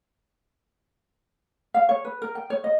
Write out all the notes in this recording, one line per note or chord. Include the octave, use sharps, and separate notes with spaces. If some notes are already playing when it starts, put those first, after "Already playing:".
F5
C#5
B4
A#4
G5
C#5
D#5